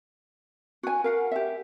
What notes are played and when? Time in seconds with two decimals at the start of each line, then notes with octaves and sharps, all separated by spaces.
0.83 F#4 G#5
1.04 A#4 F5 F#5
1.31 G4 E5